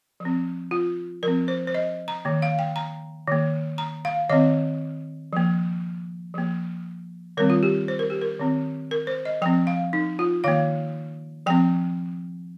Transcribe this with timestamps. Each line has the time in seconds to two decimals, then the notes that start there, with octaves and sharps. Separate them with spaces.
0.20 F3
0.25 C4
0.71 F4
1.23 F3 C4 A#4
1.48 C5
1.67 C5
1.75 D#5
2.08 A#5
2.25 D#3 A#3
2.42 F5
2.59 G5
2.76 A#5
3.27 D#3 A#3
3.78 A#5
4.05 F5
4.30 D#3 C4 D#5
5.33 F3 A#3
6.34 F3 A#3
7.37 D#3 G3 C4 A#4
7.50 F4
7.63 G4
7.88 C5
7.99 A#4
8.10 G4
8.21 A#4
8.39 D#3 C4
8.91 A#4
9.07 C5
9.25 D#5
9.42 F3 C4 G5
9.67 F5
9.93 D#4
10.19 F4
10.44 D#3 A#3 F5
11.46 F3 C4 G5